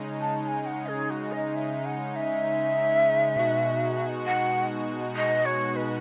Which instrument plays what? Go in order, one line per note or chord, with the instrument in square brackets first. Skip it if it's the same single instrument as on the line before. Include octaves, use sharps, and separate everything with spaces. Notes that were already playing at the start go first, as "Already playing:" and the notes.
Already playing: [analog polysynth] C#3 G#3 D#4
[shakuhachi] A5
A5
G#5
F#5
G#4
F#4
D#5
E5
F#5
E5
[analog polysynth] B2 G#3 D#4 F#4
[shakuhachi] F#5
D#5
C#5
B4